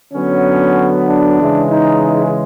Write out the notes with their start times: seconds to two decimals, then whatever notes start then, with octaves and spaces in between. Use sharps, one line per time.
0.14 D3 F#3 B3 C#4
1.08 D4
1.39 C#3 E3 G#3
1.71 D#4